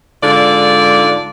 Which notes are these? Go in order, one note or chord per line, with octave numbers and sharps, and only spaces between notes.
G#2 D3 F4 D5